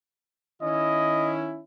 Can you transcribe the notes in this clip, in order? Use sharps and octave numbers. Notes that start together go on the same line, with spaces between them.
D#3 C#4 E4 D#5